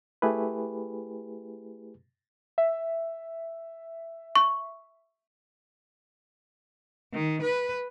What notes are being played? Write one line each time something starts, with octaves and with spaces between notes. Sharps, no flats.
A3 E4 G4 G#4 B4
E5
C#6
D#3
B4